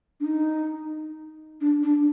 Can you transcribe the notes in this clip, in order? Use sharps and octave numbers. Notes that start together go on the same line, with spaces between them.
D4
D#4
D4
D4